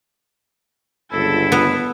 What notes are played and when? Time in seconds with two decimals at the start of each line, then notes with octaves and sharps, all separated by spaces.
1.12 G1 C#2 E4 A4
1.52 B3